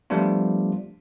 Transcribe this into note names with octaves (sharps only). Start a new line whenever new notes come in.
F3 G3 A3 B3 D4 F4